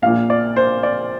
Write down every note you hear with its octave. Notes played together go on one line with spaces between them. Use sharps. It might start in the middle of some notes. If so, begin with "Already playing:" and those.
A#1 A#2 F5
D5
C5
D5